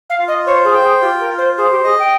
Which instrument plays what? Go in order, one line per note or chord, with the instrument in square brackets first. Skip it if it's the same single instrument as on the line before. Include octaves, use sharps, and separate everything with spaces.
[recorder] F5
[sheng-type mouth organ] F4
[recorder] D#5
[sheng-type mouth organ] C5 [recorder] C#5
[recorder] G#4
[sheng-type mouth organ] G5
[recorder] G#4
[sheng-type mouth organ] F4 [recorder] G4
[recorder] A#4
[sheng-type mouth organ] F4
[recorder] C5
[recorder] G#4 [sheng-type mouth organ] C5
[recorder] G4
[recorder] G#4 [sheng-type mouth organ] D#5
[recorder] G5